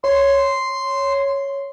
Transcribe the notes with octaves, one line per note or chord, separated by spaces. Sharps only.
C#5 C6